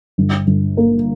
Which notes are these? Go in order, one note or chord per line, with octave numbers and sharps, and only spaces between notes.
G1
G1
A#3